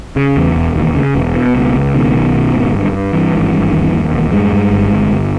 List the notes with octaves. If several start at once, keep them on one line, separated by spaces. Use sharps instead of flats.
C#3
E2
E1
D#2
C#3
E1
B2
C#2
C#2
B2 D#3
B1
B2
G#1
G2
G2
G2 E3
G#1
G2
D#2
D#2
E1
G2 G#3
G2
G1
G1
G1